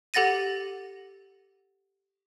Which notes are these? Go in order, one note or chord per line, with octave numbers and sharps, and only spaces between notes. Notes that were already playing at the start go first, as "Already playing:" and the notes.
G4 A4 F#5 A6 A#6 D#7